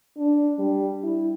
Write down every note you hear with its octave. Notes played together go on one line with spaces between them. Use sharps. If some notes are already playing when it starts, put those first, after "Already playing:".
D4
G3
E4